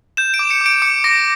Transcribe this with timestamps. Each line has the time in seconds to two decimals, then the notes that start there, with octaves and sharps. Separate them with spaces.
0.17 G6 E7
0.34 D7
0.39 D6
0.51 C#7
0.61 D6 D7
0.82 D6 C#7
1.04 D6 A#6